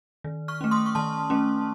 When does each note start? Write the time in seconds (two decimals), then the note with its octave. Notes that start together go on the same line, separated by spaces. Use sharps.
0.24 D#3
0.48 C#6 F6
0.61 A3 C#4
0.71 C6 D#6
0.86 C#6
0.95 D#3 A5 C6
1.30 A3 C#4